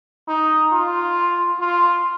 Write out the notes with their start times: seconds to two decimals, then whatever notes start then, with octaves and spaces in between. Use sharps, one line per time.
0.28 D#4
0.72 F4
1.60 F4